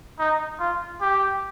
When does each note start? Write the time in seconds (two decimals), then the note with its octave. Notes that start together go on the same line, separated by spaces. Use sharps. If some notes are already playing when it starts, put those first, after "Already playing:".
0.19 D#4
0.60 F4
1.01 G4